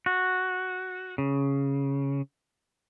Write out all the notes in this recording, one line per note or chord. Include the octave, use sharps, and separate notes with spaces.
F#4
C#3